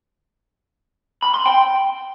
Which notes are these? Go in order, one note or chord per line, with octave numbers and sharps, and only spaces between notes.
B5
C6
G5